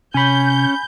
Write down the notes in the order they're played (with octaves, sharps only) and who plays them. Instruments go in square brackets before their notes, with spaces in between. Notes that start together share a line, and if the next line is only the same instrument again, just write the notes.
[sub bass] C3 [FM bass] C#4 [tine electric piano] G#5 B5 [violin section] G6